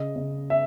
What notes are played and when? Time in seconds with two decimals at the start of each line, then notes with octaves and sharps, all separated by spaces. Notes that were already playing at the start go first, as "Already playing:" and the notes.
Already playing: C#3 D#5
0.16 C#3
0.50 E5